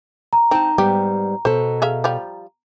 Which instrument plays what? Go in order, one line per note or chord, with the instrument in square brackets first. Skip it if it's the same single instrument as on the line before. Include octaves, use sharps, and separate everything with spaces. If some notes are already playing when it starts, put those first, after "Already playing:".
[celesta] A#5
[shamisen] C4 [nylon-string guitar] D#4 A5
[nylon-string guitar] G#2 G3 B3 [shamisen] G4
[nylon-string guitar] B2 A4 [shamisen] C5
[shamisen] G#4 E5 F5
F3 G3 F5